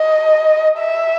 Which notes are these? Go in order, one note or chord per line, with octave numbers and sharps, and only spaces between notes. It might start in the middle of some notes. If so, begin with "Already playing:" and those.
Already playing: D#5
E5